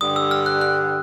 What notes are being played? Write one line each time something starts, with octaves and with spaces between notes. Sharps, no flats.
G2 D3 G3 D#6
E6
F6
F#6
F#6